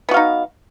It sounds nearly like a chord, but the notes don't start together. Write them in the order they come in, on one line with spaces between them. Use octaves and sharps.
B3 F#4 F5 D#4